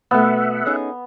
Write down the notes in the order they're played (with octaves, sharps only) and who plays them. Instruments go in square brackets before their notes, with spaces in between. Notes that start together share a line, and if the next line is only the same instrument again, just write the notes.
[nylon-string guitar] B2 A3 [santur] B3 [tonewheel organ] E5 F#5
[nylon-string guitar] C#4 D#4 G#4